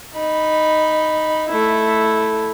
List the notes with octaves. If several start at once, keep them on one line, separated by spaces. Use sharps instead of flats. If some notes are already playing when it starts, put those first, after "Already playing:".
D#4 B5
A3 E4